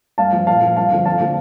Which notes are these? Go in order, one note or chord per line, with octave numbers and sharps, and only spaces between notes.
G2 F5 A5
F3
A#2 F5 A5
F3
G2 F5 A5
D3 F3
F2 F5 A5
D3 F3